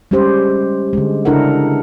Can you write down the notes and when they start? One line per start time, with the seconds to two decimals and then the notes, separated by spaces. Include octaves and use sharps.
0.11 G3 G#3 C#4 G4 C5
0.93 D3 G#3
1.25 C#3 D4 E4 A4 A#4 F#5